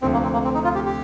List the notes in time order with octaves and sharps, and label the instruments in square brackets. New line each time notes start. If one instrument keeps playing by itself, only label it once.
[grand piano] D2 C3 F3 A3 [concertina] C4
[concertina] A#3
C4
A#3
C4
D#4
F4
G4
G4